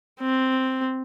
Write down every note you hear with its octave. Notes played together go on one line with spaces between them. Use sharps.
C4